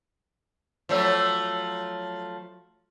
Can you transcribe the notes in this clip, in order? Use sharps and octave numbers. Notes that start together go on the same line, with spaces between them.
F3 F#3 A3